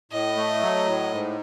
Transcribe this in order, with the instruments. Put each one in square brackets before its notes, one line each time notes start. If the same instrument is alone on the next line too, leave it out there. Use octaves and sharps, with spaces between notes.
[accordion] A2 [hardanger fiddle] D#5
[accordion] A3
F#3
A2
G#2